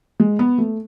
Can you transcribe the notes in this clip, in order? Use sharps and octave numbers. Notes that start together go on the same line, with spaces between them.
G#3
B3
A3